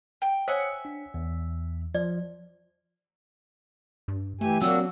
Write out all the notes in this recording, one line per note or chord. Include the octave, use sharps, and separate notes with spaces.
G5
C5 C#5 E5 F#5 G#5 D#6
D4
E2
F3 D5
G2
E3 A3 G4 G#5
F#3 A#3 C4 D4 F#4 E6